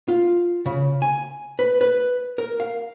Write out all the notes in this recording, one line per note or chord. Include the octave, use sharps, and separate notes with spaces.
F4
C#3
G#5
B4
B4
A#4
F5